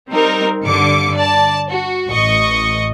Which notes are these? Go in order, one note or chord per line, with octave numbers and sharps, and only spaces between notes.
G3 C4 D#4 A#4
G2 D3 D6 C#7
D5 A5
F#4
A1 D#5 C#6